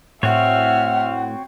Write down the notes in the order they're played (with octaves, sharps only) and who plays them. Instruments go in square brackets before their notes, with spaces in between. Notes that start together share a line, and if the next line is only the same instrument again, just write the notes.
[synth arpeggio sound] A2 [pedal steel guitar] C4 F#4 C#5 [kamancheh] E5 F6 [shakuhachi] F#5